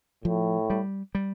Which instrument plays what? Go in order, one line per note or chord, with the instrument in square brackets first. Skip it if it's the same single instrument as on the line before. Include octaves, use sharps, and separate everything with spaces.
[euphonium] A2 [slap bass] F3
[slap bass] G3
G3